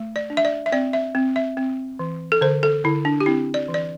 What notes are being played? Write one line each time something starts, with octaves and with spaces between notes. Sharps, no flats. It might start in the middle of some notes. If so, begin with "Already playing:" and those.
Already playing: A3
D5
D4
E5
D5
E5
C4 D5
E5
C4
E5
C4
E3
A4
D3 C5
A4
D3 E4
D4
G4
C4 E4
D5
E3
D5